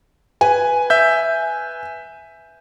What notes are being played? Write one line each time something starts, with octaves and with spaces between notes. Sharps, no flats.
B4 G#5
E5 G6